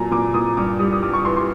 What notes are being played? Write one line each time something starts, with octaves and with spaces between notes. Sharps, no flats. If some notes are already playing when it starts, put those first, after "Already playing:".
Already playing: A#2 F#3 G#5 A#5
A#2 D6
A#2 D#6
G2 D6
G3 D#6
D#6
G2 D6
C#6
E3 C6
C6